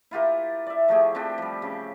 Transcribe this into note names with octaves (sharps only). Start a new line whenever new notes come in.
E4 F4 G4 A#4
D5 E5
F3 A3 G4 G#4
F3 C4 D4 G4
F3 G3
C#3